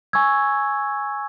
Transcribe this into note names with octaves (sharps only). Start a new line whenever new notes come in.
G#5 C#6 E6 G#6